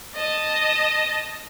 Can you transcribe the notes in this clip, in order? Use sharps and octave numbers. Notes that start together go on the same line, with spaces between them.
D#5 A5